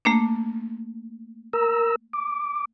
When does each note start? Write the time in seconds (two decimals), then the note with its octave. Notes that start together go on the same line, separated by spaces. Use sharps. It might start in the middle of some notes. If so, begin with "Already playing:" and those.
0.05 A3 A#3 D4
1.53 A#4 A#5 E6
2.13 D6